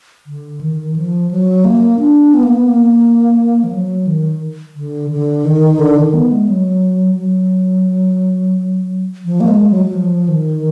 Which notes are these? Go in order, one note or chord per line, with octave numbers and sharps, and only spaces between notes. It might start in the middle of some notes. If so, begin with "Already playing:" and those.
D3
D#3
F3
F#3
A#3
D4
B3
A#3
B3
A#3
F3
F#3
D#3
D3
D3
D#3
D3
D#3
B3
G#3
F#3
F#3
F3
A#3
G#3
F#3
F#3
F3
D#3